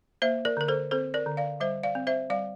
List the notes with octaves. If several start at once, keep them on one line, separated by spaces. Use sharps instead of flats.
A#3 C5 E5
A#4 D5
D3 A#4
A4 C5
C4 A4 C5
A#4 D5
D3
D5 F5
G3 C5 E5
D5 F5
C4
C5 E5
G3 D5 F5